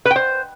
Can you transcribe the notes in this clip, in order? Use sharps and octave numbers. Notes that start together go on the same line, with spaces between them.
B4
G5
C5